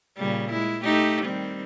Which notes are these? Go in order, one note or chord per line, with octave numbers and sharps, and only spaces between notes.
A#2 C#3 G3
G#3 E4
A3 D#4 G4
D#3 G3 C4